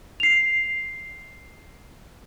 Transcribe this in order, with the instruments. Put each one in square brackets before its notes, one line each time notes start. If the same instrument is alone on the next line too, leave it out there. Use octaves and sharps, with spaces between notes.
[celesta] C7 F7